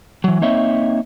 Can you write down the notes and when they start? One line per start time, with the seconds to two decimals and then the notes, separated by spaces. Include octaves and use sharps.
0.24 E3 F#3
0.42 A#3 C4 D#4 C#5 D#5 E5